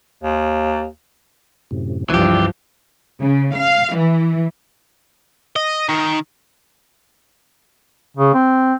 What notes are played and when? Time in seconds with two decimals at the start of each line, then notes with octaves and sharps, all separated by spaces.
0.23 D#2
1.71 F#2 A2 C3
2.10 C#2 G2 E3 F3 G4 D5 F5
3.21 C#3
3.55 F5
3.95 E3
5.56 D#5
5.89 D#3
8.17 C#3
8.34 C4